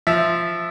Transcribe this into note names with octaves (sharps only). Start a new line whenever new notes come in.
F3 E5